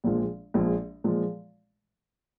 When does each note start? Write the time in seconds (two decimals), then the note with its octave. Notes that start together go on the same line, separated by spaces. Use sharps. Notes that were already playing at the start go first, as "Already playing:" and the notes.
0.04 A#1 A#2 F3 G#3
0.54 A#1 A#2 F3 G#3
1.04 A#2 F3 G#3